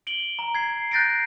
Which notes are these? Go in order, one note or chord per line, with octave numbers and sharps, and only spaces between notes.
D7 F#7 G7
A#5
G#6 C7
F#6 G6 A6 A#6 C7 D7